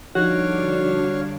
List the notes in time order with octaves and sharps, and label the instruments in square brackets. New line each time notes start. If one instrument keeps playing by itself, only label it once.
[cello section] D3 G3 D4 [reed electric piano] F3 D#4 [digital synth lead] F#4 [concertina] C#5 F5